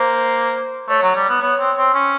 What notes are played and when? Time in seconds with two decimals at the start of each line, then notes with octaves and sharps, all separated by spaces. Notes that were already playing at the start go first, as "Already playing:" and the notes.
Already playing: A#3 C5
0.89 A3 C#5
1.02 F#3
1.15 G3
1.29 B3
1.41 B3 C#5
1.59 C4
1.77 C4
1.94 C#4